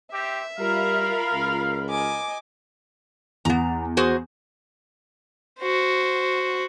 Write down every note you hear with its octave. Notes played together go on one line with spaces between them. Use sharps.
C4 G4 E5
G3 F4 A#4 F5 B5
C#2
D#5 G#5 D6
E2 B3 A#5
F#4 G#4 C5
F#4 C5